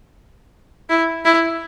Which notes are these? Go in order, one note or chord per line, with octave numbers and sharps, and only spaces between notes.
E4
E4